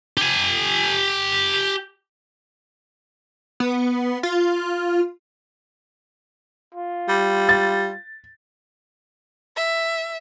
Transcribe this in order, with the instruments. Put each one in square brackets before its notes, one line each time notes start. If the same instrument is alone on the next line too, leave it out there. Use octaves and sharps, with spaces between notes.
[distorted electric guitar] G4 G#5
[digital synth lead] B3
F4
[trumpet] F4
[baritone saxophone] G3
[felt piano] A6
[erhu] E5